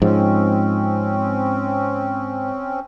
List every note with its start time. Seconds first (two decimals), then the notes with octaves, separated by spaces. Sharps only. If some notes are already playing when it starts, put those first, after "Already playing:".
0.02 G#2 F3 C4 C#4